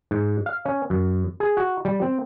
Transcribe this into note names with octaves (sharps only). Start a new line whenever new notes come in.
G#2
F5
C#4
F#2
G#4
F#4
G3
C4